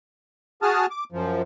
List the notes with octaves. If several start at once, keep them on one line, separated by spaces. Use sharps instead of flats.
F#4 G#4 A5 D#6 F6
D6
F#2 F3